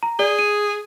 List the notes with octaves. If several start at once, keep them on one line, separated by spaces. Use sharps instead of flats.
A#5
G#4 D5 G7
D#7